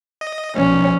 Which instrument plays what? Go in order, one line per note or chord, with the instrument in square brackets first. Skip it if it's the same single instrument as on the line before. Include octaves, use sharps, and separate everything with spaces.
[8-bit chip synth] D#5
[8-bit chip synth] B1 [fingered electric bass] F3 A#3 [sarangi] C#4